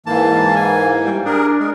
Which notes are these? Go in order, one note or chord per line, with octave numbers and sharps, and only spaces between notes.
G#2 E3 A#3 A5
G#5
G3
D4 G#4 A#4
G#3 A#4